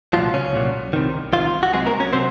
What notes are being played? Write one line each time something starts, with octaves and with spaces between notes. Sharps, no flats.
C2 A#2 F3 F#3 F4
C#3 C#4
C2 A#2 F#3
C2 C3 D#3
C2 C3 D#3 F3 F4
F#4
C2 C3 F#3 G#3 G#4
A#3 A#4
C#4 C#5
C3 F#3 C4 C5